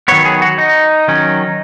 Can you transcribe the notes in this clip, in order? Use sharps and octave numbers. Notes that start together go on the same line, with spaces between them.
D#3 F#3 B3 C#5
G#4
F#4
D#4
D#3 F#3 C#4